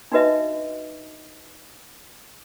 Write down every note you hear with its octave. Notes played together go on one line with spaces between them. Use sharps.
D4 D#4 F#4 B4 D#5 E5